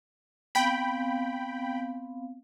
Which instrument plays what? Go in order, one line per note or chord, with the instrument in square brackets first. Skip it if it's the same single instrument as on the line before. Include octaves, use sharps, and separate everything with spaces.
[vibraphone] B3 C4 F5 [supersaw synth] G5 B5